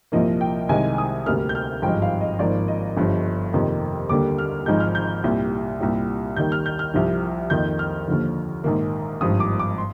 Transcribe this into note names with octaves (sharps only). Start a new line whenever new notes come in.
C2 A#2 F3 A#3 D#5
G5
C2 C3 D#3 G#3 G#5
D#6
D2 C3 G3 A#3 F6
G6
F6
G#1 G2 F3 G#3 G5
F5
D#5
G#1 G#2 F3 A#3 D5
D#5
G1 G2 F3
F2 C3 D#3 A#3
D#2 D3 G3 A#3 D6
F6
G#1 G#2 F3 G#3 G6
F6
G6
C2 A#2 G3
C2 A#2 G3
D#2 D#3 G3 A#3 G6
F6
G6
F6
C2 C3 F3
F2 D#3 A#3 G6
F6
D#2 D3 F3
A#1 G#2 D#3 A#3
G#1 G2 F3 D#6
D6
D6
C6